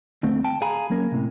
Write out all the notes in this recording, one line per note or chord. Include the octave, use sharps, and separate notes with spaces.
D2 A3 C4
G5 A5
G#4 F5 G#5 A#5 B5
F#3 A#3 C#4 A#4
A2 C3